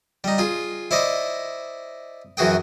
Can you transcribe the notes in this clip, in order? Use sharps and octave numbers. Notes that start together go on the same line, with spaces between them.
G3 D#4
F4 G#4
E4 C5 D5 D#5
F#2 E3 F#4 G#4 G5